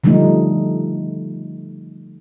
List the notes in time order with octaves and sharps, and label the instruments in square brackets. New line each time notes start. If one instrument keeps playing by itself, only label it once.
[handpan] D3 F3 G3 A3 D#4